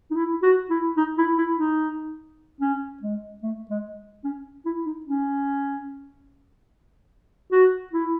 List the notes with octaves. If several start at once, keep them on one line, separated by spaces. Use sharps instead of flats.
D#4
E4
F#4
E4
D#4
E4
E4
D#4
C#4
G#3
A3
G#3
C#4
E4
D#4
C#4
F#4
E4